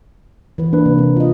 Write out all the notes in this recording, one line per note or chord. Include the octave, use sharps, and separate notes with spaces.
E3 B4
A#3 D4 B4
C3
C4 A#4
F4 D#5